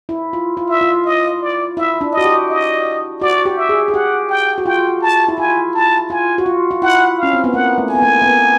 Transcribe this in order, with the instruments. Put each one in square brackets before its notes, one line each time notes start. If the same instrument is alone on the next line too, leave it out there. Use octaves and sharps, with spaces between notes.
[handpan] E4
F4
F4
[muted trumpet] E5
[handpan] F4
[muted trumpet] D#5
D5
[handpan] E4 [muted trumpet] E5
[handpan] D4
[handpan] F#4 [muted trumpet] D#5
[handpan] G4
[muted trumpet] D#5
[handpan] F#4 [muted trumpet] D5
[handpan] G4
[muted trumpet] E5
[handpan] G#4
G#4
[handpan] G4 [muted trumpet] F#5
[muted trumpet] G5
[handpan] F#4
[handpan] F4 [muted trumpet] G5
[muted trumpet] A5
[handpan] E4
[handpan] F4 [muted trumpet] G#5
[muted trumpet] A5
[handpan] F4 [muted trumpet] G#5
[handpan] F#4
F4
F4
[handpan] E4 [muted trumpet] F#5
[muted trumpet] F5
[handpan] C#4
C4
B3
[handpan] A#3 [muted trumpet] F#5
[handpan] A3
[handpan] B3 [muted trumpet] G#5
[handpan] A#3
A#3
B3